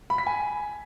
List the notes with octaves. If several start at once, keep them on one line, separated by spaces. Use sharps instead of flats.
B5
B6
G#5